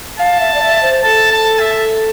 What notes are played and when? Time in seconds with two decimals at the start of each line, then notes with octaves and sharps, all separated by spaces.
0.19 F5 A5
0.40 E5
0.54 D5
0.62 E5
0.83 C5
1.04 A4 A5
1.32 A5
1.60 E5